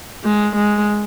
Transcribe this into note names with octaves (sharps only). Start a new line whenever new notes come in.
G#3
G#3